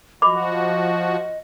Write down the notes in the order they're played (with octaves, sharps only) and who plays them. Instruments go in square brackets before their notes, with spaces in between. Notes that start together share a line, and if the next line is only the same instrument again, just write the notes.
[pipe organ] F3 F#4 [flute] D#5 [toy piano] B5 D6